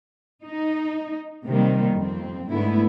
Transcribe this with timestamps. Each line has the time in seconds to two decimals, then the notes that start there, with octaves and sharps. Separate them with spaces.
0.44 D#4
1.45 C3 D#3 G3 A#3
1.95 F2 C4
2.49 G#2 D3 A3 B3 E4